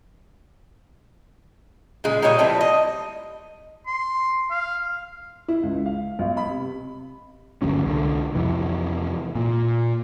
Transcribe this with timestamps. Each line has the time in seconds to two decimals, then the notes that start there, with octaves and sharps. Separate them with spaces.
2.04 A#2 C#3 G#3
2.22 A#2 G3 G4 C#5 D#5
2.38 F3 G3 A3 C4 E4
2.61 D#5
3.87 C6
4.51 F5
5.48 E4
5.63 C#2
5.86 F5
6.19 B1
6.37 B5
6.49 C3
7.62 G1 D2 F#3 C#4
7.86 C2 D3
8.35 F2 C3 E3
9.35 A#2